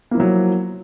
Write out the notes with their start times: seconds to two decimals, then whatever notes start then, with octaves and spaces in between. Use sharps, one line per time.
0.11 A#3
0.14 E4
0.17 F3
0.20 F#3